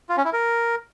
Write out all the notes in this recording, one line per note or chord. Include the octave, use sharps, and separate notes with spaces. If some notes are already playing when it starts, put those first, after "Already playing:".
F4
C#4
E4
A#4